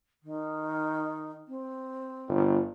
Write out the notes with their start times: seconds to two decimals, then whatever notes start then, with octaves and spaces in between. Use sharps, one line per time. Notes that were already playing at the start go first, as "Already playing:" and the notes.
0.22 D#3
1.48 C4
2.28 G1